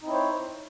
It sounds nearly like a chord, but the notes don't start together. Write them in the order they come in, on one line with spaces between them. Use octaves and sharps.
D#4 C4 E4 C#5 C5